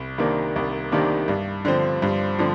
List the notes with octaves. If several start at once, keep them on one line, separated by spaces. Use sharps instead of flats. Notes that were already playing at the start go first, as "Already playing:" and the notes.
Already playing: C2
C3 D#3 A#3 D4
C2
C3 D#3 A#3 D4
G2
D3 F3 C4
G2
D3 F3 C4